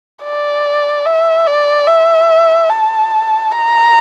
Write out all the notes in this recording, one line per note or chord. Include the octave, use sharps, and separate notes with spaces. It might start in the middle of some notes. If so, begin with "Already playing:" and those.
D5
E5
D5
E5
A5
A#5